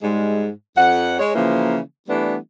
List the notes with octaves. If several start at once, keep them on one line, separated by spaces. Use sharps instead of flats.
G#2 G3 G#3
F2 F#5
G#3 C#5
C#3 E3 F3 A#3
E3 G3 A3 B3 D4